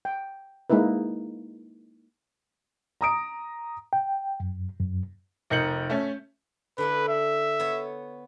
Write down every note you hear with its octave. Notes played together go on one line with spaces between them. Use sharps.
G5
G#3 A#3 D#4 E4 B4
A#5 D#6 D7
G5
F#2
F#2
F1 D#4 A#4 G6 C#7 F#7
A3 C#4
D3 D4 E4 B4
E5
B3 C#5